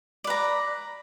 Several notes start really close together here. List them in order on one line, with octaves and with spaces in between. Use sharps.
D5 B4 A#5